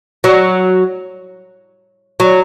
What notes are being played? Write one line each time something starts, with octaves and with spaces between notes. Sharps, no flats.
F#3
F#3